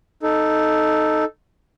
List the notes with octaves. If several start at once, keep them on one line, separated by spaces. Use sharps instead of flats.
D#4 A4